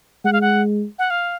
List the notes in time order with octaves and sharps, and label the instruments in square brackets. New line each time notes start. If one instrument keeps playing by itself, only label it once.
[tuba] G#3 [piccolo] F#5
[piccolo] F5
F#5
F#5
F5